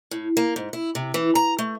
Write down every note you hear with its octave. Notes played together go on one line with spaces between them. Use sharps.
A2
A#3
G#2
E4
C3
E3
A#5
A3